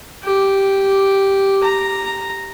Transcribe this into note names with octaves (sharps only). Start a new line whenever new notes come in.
G4
A#5